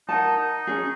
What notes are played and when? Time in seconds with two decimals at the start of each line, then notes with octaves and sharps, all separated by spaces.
0.09 D#4 A#4 F#5 A5
0.37 D#4
0.67 C#4 G#4